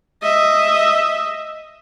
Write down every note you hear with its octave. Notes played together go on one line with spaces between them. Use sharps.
D#5 E5